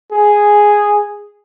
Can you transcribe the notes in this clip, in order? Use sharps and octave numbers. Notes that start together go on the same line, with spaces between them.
G#4